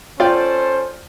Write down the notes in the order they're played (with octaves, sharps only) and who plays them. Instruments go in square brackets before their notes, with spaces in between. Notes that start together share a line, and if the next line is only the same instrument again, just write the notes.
[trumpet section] C#4 A4 C5 [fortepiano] F4 D5 G5